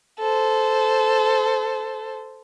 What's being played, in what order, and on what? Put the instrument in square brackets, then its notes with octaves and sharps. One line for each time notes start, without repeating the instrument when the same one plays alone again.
[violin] A4 C5